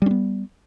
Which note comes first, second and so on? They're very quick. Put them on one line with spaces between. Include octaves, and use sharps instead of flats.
G3 C#4 B3